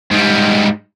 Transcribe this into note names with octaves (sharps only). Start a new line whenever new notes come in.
G#2 G3